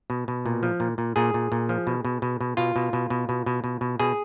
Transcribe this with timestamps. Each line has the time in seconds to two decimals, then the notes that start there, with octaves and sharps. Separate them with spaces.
0.10 B2
0.28 B2
0.46 A#2
0.63 F3
0.80 A#2
0.98 A#2
1.16 A#2 G#4
1.34 A#2
1.52 A#2
1.69 F3
1.87 B2
2.05 B2
2.22 B2
2.41 B2
2.57 B2 F4
2.76 B2
2.93 B2
3.10 B2
3.29 B2
3.46 B2
3.64 B2
3.81 B2
4.00 B2 G#4